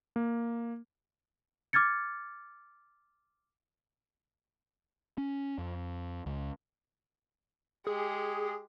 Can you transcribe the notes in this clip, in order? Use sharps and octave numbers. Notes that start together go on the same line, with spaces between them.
A#3
D6 F6 G#6 A6 C#7
C#4
F2
C#2
G#3 G4 G#4